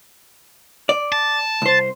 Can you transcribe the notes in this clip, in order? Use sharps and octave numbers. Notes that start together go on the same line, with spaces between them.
D5
A5
C2 C5